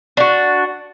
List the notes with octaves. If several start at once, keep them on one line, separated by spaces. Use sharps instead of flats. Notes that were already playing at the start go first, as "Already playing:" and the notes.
D4 F#4